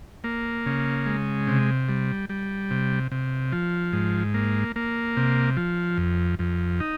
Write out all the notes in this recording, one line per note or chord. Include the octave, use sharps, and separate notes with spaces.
A#3
C#3
G#3
C3
G3
G3
C3
C3
F3
G#2
A#3
A#3
C3
F3
F2
F2
D#4